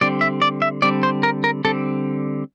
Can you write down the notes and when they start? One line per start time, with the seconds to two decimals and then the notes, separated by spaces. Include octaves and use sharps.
0.01 D3 G3 C4 D5
0.21 E5
0.42 D5
0.62 E5
0.82 D3 G3 C4 D5
1.03 C5
1.23 A#4
1.44 A#4
1.65 D3 G3 C4 A4